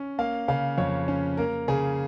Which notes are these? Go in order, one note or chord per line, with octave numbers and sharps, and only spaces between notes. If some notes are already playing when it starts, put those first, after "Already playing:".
Already playing: C#4
A#3 F5
C#3 F5
F2 C#5
C#4
A#3 A#4
C#3 G#4